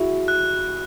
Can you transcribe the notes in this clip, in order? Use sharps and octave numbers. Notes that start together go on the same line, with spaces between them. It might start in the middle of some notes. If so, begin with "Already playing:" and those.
Already playing: E4 F#4 G#4
F#6